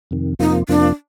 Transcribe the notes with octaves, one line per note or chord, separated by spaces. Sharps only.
F2 C3 D#3
F2 C3 F3 A#3 D#4 F4
F2 C3 F3 A#3 D4 F4